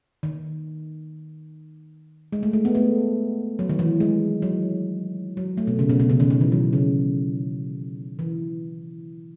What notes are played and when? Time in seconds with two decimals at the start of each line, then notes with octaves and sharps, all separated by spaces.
0.23 D#3
2.33 G#3
2.43 A3
2.53 A3
2.65 B3
2.75 A3
3.59 F#3
3.69 D#3
3.79 E3
4.00 G#3
4.42 F#3
5.37 F#3
5.57 A3
5.67 B2
5.79 C#3
5.89 B2
6.00 B2
6.10 C#3
6.20 D#3
6.30 D#3
6.41 E3
6.52 F#3
6.73 C#3
8.19 E3